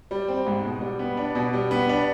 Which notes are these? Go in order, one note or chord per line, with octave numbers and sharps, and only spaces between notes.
G3
C4
G#2
B2
G3
B3
D4
B2
G3
B3
D4